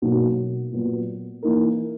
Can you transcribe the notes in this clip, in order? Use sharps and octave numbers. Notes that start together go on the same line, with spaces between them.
B2 F#3 A#3 D#4 F#4
A#2 F#3 B3
E3 A#3 D#4 A#4